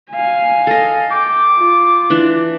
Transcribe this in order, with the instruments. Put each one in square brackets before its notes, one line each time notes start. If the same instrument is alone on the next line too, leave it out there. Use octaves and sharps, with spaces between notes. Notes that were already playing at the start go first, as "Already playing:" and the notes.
[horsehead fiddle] F5 G#5
[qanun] A4 D#5
[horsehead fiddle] G5 [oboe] D6
[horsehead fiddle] F4
[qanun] E3 D4